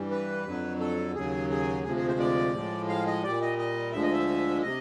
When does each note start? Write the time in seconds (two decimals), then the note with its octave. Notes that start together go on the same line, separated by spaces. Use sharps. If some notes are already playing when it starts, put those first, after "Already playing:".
Already playing: G2 E3 G3
0.11 B4
0.45 F2 D3 F#3
0.80 A4
1.14 D#2 C#3 F#3 G#4
1.50 G#4
1.84 D2 C3 F3 G#3 G#4
1.96 G#4
2.08 C5
2.19 D5
2.54 A2 F3 G#3
2.89 F5
3.07 D#5
3.23 A#2 G3 D5
3.42 D#5
3.58 D#5
3.93 D2 D3 F3 G#3 E5
4.03 D#5
4.13 E5
4.63 C3 D#5